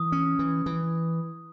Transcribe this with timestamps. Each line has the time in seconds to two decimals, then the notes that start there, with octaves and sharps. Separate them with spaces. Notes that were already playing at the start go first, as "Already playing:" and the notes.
Already playing: E3 D#6
0.12 C#4
0.39 E3
0.66 E3